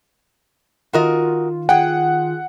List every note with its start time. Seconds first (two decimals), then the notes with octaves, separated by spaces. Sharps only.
0.93 D#3 F4 F#4 A#4 D#5
1.69 G#4 F#5 G5